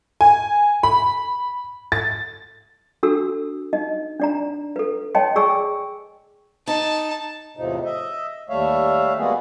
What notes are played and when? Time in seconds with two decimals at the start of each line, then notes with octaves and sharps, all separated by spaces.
0.21 G#5
0.83 B5
1.92 A6
3.03 D4 F#4 A4 E6
3.73 D#4 D#5
4.20 D4 D5 A#5
4.76 A4 B4
5.15 C#5 D#5 G5 A5 C6
5.36 G#4 D5 G5 G#5 C#6 E6
6.68 D#4 A5
7.57 E2 A2 C3 F3 D#4
7.85 D#5 E5
8.49 D#2 G3 A3 C#5 E5 F5
9.18 G3 G#3 A#3 B3 F#4 G#4